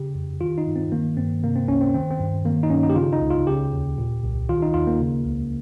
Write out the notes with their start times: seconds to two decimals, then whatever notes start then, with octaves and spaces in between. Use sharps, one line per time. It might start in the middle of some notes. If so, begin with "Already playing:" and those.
Already playing: C#3 G4
0.15 F2
0.41 D#3 F4
0.58 D#4
0.67 G2
0.76 C4
0.92 D#3 A#3
1.17 G2 C4
1.43 C3 A#3
1.56 C4
1.68 C#2 C#4
1.81 C4
1.94 D#3 C4
2.11 C4
2.20 G2
2.45 D#3 A#3
2.63 D#4
2.70 G2 C#4
2.83 D#4
2.90 G4
2.96 C#3 F4
3.13 D#4
3.22 C#2
3.30 F4
3.47 C#3 G4
3.73 D#2
3.98 A#2
4.24 C2
4.49 D#3 F4
4.62 D#4
4.74 D#2 F4
4.87 A#3
4.99 C#3
5.25 C#2